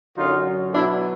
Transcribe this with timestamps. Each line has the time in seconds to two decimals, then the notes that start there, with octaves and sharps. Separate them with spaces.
0.15 F#2 D3 F#3 D#4 F4
0.71 B2 F#3 D4 E4